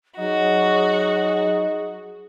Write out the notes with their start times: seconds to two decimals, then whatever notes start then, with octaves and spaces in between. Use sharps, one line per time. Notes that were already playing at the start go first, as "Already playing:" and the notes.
0.18 F#3 D#4 F#4 G#4